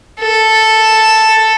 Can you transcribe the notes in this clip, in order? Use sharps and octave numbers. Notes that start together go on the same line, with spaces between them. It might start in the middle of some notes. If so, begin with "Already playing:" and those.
A4